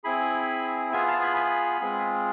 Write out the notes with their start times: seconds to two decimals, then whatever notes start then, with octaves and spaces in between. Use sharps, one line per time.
0.04 C4 E4 G#4 G#5 B5
0.93 B3 F4 G#4 E5 G#5
1.08 F5 A5
1.22 G#5 B5
1.37 G#5 B5
1.81 G#3 C4 F4 G#4